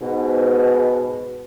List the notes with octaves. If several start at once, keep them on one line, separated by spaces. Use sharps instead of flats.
G#2 B2